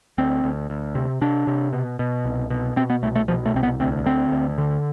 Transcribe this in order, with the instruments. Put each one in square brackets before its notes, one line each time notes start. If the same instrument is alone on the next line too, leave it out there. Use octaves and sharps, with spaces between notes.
[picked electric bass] D2 C4
D2
D2
C3
C3 D4
C3
B2
B2
C2
B2
B2 C4
B3
C2 A3
A3
B2 F3
A3
C2 C4
B3
D2 C4
D3 C4
D2
D3